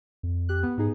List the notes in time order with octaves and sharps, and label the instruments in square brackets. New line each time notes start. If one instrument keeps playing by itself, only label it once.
[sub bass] F2
[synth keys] G4 F#6
B3
[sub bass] G#2 [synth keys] B3 D#4 G#4